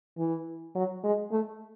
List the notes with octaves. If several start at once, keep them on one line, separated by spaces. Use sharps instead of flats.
E3
F#3
G#3
A3